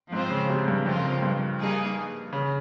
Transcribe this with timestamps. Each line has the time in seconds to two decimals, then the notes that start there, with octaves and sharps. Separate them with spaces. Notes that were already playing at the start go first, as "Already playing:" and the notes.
0.12 G#2 F3 C4 F4 C5
0.30 C#3
0.49 C3
0.68 G2
0.86 F2 C#3 F3 C4 F4 A#4
1.22 G2
1.59 G3 A#3 D#4 G#4
2.33 C#3